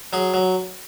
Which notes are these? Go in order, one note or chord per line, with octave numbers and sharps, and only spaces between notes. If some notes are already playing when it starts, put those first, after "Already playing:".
F#3 G#4
F#3